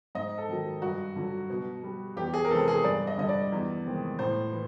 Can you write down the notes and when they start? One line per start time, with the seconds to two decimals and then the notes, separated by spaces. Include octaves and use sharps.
0.15 G#2 D#5
0.38 A4
0.49 D#3 F#3
0.82 G2 F#4
1.16 D3 F#3
1.50 B2
1.83 G3
2.17 E2 G4
2.34 G#4
2.45 A#4
2.51 C3 E3 G#3 A4
2.68 G#4
2.84 G2 D5
3.07 D#5
3.18 D3 G3 D#5
3.29 D5
3.52 E2
3.85 C3 D#3 G#3
4.19 A2 C5
4.52 E3